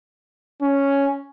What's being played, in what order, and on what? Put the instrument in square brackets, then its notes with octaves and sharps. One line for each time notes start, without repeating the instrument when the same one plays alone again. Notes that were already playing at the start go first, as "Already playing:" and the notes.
[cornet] C#4